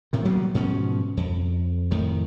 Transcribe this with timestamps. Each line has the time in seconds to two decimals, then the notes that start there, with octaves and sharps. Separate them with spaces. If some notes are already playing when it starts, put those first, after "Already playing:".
0.13 A2 C3 D#3
0.25 F#3 G3 A#3 B3
0.55 G#2 B2 F3 C#4
1.17 F2
1.91 F2 A2 D#3